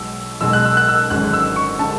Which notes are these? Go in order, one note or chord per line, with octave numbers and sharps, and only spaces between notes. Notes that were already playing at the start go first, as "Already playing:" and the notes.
Already playing: B1 B2 G#3 E6
B1 B2 G#3 E6
F#6
E6
F#6
E6
G#1 F#2 D3 G#3 F#6
E6
C#6
D3 G#3 A5